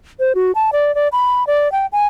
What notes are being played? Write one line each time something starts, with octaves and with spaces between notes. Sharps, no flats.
C5
F#4
A5
D5
D5
B5
D5
G5
G#5